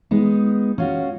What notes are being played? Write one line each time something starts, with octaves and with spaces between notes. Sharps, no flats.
G#3 B3 D#4
C#4 F4 F#4